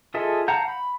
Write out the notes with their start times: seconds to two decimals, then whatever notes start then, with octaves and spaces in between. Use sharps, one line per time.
0.14 F4 G#4 A4 D#5 E5
0.48 F5 F#5 A5 A#5 G6
0.68 B5